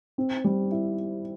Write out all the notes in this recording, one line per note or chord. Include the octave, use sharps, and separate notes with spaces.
C4
G3
E4